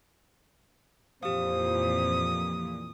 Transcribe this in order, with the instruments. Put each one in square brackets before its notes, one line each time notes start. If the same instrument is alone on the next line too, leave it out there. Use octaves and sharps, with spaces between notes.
[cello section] F2 A#2 E3 [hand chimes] G4 F5 [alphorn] C5 [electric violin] D#6